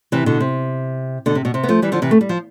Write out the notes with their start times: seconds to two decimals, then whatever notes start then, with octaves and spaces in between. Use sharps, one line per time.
0.12 C3 E3
0.26 B2 D3
0.40 C3
1.26 B2 D3
1.35 C3
1.45 B2
1.54 C3
1.63 B3
1.69 F3 A3
1.82 E3 G3
1.92 D3 F3
2.02 C3 E3
2.11 A3
2.21 G3
2.29 F3